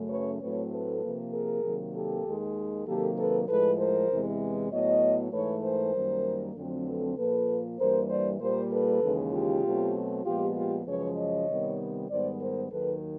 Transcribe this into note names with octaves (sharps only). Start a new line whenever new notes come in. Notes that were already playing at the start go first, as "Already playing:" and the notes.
Already playing: F#2 C#3 F#3 A3
B4 C#5
A2 F#3 A3 C4 B4 C#5
A4 B4
C3 F3 A#3
G#4 A#4
C3 D#3 F#3 A#3
G4 A4
D#2 D#3 G#3
C3 D#3 F#3 A#3 G4 A4
A4 B4
A2 F3 G#3 A4 B4
A#4 C5
E2 C3 E3 G#3
A2 F#3 B3 C#5 D#5
G#2 E3 A3 B4 C#5
A#4 C5
F#2 D#3 G3 A#3
F2 D3 F#3 A3 C4
A4 B4
A#2 F3 A#3 A4 B4
G2 E3 G3 A#3 A#4 C5
C5 D5
A#2 G3 A#3 A#4 C5
A4 B4
D#2 C#3 E3 G#3
F4 G4
B2 F#3 A3 C4
A#2 F3 G#3 B3 F4 G4
F4 G4
F#2 C#3 F3 G#3 B4 C#5
C#5 D#5
C3 D#3 G3 B3
G#2 D#3 G3 B3 C5 D5
A#4 C5
D#2 D#3 F#3 A4 B4